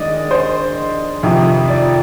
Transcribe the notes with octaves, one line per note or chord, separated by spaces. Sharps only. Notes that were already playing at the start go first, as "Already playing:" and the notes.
Already playing: D#3 G#3 D4 D5 D#5
C5
F2 C3 D#3
D5